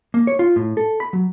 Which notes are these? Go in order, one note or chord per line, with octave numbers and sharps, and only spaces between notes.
A#3
C#5
F4
A2
A4
B5
F#3